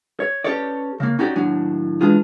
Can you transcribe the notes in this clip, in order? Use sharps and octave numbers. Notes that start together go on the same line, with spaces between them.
C#5
C#4 G4 A4 B4 C#5 D5
C#3 A#3
C#4 D#4 F#4 G4 D5
D#2 A2 F#3 D4 G#5
E3 G#3 D4 F4 G#4